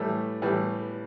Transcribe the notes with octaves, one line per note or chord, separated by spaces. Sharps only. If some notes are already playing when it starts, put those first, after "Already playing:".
Already playing: A2 E3 G3 A3
A2 E3 G3